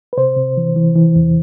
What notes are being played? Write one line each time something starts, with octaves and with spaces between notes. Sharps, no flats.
B4
C3 C5
C3
E3
E3
E3
E2